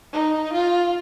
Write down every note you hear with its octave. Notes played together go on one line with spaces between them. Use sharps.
D#4
F4